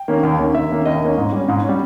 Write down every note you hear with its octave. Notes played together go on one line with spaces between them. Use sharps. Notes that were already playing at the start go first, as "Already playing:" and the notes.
Already playing: G5
D#3 A#3 C#4
D#2
D#3 A#3 C#4
D#2 E5
D#3 A#3 C#4
D#2 D#5
D#3 A#3 C#4
G#2
G3 C#4
G#2
C#4
G3